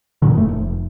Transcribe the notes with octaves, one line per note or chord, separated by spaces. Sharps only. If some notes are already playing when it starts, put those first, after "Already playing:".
F#2 A#2 D3 D#3
E1 A3
F1